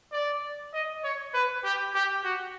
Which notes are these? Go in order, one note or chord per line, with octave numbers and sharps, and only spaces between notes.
D5
D#5
C#5
B4
G4
G4
F#4